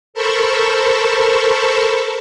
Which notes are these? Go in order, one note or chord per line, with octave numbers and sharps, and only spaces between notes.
A4 A#4 C5 A5 B5 C#6